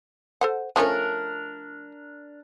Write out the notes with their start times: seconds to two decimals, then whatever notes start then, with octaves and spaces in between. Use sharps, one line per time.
0.41 A4 C5 F#5
0.76 F3 A3 C#4 D4 A#4